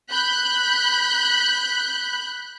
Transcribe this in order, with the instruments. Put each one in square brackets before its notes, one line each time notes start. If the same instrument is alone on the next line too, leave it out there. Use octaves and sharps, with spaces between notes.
[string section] B5 F#6 G6